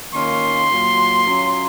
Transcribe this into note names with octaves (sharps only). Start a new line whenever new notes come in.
D#3 A#3 C#4 F4 C6
A#2 F#3 A#3
F#3 C#4 F4